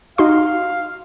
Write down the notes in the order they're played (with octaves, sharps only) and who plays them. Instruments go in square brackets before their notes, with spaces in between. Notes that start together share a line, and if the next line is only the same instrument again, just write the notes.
[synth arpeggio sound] D#4 F#4 C6 [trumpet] F5